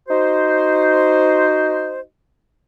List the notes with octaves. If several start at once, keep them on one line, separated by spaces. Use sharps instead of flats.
D#4 F#4 C5